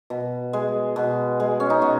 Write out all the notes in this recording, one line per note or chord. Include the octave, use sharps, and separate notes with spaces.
B2
G#3
B2
G#3
C#4
D#4
B2 F#4